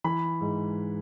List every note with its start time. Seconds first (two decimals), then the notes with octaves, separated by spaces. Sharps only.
0.04 E3 B5
0.41 G#2